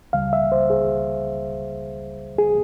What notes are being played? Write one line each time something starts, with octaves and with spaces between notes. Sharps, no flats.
C#2 C#3 G3 F5
E5
C5
G#4
G#4